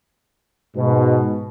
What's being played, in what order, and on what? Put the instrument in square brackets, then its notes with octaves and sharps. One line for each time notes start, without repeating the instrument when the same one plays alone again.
[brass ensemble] G#2 B2